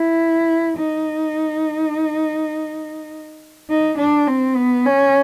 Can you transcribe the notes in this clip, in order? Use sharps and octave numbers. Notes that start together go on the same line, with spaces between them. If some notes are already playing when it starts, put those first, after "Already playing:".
Already playing: E4
D#4
D#4
D4
C4
B3
C#4